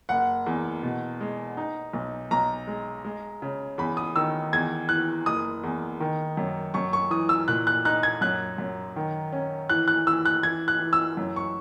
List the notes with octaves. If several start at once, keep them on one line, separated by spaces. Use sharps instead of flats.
F#1 F#5
E2
B2
G#3
D#4
B1
B1 A#5
G#3
G#3
C#3
E2 B5
D#6
D#3 E6
E2 G#6
E3 F#6
F#1 D#6
E2
D#3
F#2
F#2 C#6
C#6
E3 D#6
E6
A#2 F#6
F#6
D#4 F#6
G#6
F#2 F#6
F#2
D#3
C#4
E3 F#6
F#6
E3 E6
F#6
E3 G#6
F#6
E3
E6
F#2
C#6